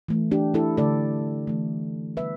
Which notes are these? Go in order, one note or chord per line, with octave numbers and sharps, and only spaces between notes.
E3 A3
D4 G4
E4 A4
D3 A3 A4 D5
E3 A3
D3 G3 B3 B4 E5